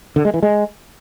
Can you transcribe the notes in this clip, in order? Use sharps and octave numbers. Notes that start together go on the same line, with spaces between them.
D3
G#3
E3
G#3